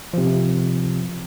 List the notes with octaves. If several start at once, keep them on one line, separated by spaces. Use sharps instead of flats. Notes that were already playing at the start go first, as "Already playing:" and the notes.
C3 F3